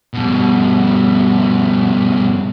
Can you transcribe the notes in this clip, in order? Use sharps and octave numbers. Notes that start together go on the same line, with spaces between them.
G2 B2